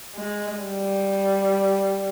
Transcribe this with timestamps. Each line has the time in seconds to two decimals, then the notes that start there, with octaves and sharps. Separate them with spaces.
0.16 G#3
0.63 G3